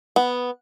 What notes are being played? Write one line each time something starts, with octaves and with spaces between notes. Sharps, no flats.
B3